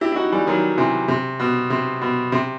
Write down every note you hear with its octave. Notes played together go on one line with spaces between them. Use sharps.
E4 G4
E4
D#4 F#4
E3 G3
D#3 F#3
C3 E3
C3
B2
C3
B2
C3